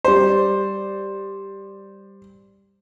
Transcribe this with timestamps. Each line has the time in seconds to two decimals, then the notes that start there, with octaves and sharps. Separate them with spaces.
0.04 G3 C5